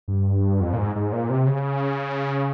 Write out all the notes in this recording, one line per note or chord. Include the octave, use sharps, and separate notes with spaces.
G2
F2
A#2
G#2
G#2
A#2
C3
C#3